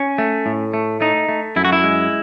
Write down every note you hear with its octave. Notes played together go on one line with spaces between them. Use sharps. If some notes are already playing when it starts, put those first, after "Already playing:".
Already playing: C#4
A3
A2
A3
A3 D#4
A3
F#2 E4
F#4
E4
G#3